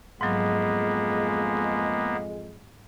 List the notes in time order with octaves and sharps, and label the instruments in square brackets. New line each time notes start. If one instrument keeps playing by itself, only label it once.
[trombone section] F2 G#3 [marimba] G#2 F#3 [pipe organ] A#3 B3